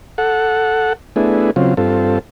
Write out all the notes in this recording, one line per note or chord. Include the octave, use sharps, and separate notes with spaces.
A4 F#5
A3 B3 D4 E4 G#4
C#3 F#3 C4 F4
G2 C4 F4 A4